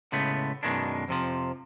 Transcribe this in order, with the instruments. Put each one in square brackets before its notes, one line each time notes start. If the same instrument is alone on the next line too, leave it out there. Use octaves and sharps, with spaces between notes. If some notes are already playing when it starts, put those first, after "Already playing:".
[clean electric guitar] A2 C#3 G#3 A3 B3
B1 F#2 B2 D#3 G#3 D4
F2 C3 F3